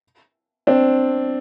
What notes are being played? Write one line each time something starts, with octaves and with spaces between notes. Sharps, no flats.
C4 D4